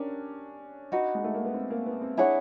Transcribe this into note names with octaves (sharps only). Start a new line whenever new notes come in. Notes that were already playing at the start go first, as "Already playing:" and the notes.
Already playing: C#4 D4 G4 A#4
D#4 F#4 B4
G#3
A3
A#3
B3
C4
A#3
B3
C4
D4 E4 G#4 C#5 F#5